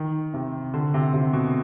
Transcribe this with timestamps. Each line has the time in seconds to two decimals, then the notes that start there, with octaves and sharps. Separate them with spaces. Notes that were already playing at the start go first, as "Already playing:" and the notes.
Already playing: D#3
0.34 C3
0.74 D3
0.94 C3
1.14 C3
1.33 B2